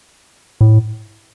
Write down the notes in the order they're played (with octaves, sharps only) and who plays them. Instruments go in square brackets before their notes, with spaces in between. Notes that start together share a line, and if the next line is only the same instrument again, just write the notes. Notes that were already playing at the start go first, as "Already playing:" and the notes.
[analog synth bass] A2